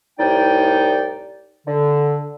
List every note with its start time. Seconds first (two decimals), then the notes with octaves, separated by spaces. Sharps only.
0.19 C2 A2 D#4 D5 G5
1.67 D3